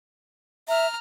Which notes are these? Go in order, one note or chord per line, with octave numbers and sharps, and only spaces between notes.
E5 A#5 F6